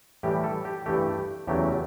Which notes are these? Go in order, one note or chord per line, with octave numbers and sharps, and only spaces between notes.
A2 E3 G3 G4
A4
G4
G2 E3 A3 G4
E2 C#3 F#3 A3 G4